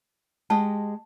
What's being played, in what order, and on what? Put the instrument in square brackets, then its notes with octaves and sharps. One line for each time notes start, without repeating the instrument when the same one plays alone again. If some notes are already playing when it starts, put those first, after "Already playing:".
[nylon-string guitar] G#3 G4 D#5 [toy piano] A5